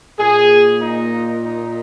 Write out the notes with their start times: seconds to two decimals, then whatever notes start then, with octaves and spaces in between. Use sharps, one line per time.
0.19 A#2 A#3 G#4
0.82 D#4
1.45 D#4